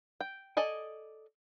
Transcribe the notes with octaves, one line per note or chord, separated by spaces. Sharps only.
G5
A4 D5 D#5 G#5